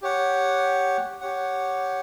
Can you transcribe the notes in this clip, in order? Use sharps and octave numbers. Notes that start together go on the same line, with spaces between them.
G4 C#5 F#5
G4 C#5 F#5